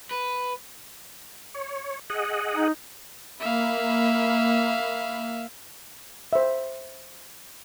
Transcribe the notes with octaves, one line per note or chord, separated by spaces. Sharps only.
B4
C#5
G#4 D#5 F#5
D#4
A#3 E5 F5 B5
C5 E5